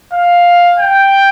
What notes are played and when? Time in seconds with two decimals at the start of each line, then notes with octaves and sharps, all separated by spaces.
0.13 F5
0.79 G5